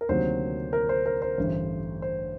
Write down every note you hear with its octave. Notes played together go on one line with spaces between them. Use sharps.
A#4
D2 C3 D#3 F#3 A#3 C5
A#4
C5
A#4
C5
A1 G2 D3 A3
C5